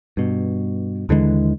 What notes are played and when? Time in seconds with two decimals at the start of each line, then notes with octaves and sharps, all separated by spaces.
0.17 G2 B2
1.09 D#2 D3 E3 G#3